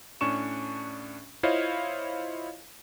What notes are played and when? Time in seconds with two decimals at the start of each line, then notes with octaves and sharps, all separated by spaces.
0.21 A2 C#4 D4 C#6 E7
1.43 E4 F4 C5 C#5 D#5 F5